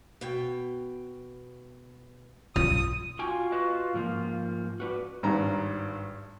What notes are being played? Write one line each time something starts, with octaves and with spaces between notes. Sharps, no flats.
B2 G5
B1 F4 D#6
F4 F#4 G5 G#5
F#4 B4 D#5
G#2 F3 A#3
F#4 B4 D5
G#1 G2 A#5